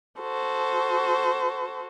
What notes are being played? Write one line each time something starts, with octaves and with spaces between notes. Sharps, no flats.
F#4 A4 C5